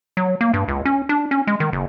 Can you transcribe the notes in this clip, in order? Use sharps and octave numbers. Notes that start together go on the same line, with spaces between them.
F#3
A#3
G2
C#2
C#4
D4
C#4
G#3
D#3
F#1